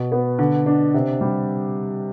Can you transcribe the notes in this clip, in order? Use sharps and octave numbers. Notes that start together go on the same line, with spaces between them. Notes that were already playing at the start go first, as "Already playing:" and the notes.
Already playing: B2
B3
D3
D4
C3
G3